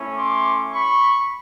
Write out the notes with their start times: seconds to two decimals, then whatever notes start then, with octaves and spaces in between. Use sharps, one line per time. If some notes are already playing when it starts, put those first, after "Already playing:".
Already playing: A3 C#4 E4
0.17 C6 D6
0.73 B5 C#6